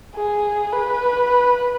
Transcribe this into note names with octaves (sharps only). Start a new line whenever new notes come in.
G#4
B4